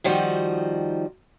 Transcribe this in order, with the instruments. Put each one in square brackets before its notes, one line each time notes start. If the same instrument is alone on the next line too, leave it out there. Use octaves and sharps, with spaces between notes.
[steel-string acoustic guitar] D#3 F3 G3 D#4 F#4